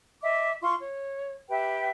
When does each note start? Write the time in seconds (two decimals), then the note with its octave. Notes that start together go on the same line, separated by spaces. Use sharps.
0.22 D#5 E5 D6
0.62 F4 C6 C#6
0.82 C#5
1.49 G4 B4 E5 G5